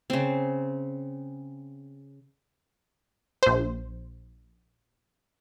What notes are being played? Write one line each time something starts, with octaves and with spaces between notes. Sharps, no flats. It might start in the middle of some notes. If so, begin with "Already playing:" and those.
C#3 C4
A#1 C5